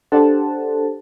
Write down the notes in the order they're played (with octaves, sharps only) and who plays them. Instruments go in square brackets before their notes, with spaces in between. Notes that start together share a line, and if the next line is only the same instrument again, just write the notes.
[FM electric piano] D4 G4 A4 C5 F#5 A5